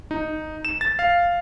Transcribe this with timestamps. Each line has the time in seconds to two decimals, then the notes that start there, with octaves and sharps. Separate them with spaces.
0.11 D#4
0.65 E7
0.81 A6
0.99 F5